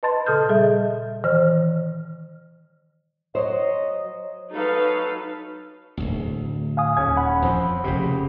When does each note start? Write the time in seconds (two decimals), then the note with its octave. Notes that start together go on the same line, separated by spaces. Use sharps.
0.03 B4 D#5 A5 B5 C6 A6
0.26 A#2 C#3 A4 D#6 F6 G6
0.49 G3 G#4 D#5 E5
1.24 D#3 E3 C5 F6
3.35 F#3 C5 C#5 D#5
4.53 F#3 D#4 A4 B4 F5
5.97 D1 G#1 D2
6.77 F5 G#5 D#6
6.97 D#1 C#4 G#6
7.17 F#5 B5
7.42 F2 F3 C4
7.84 F1 A#2 C#3 G4